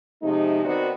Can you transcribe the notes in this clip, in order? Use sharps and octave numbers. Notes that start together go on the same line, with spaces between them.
C3 F3 G#3 A3 D#4
D#3 B3 C4 D#4 F#4 D5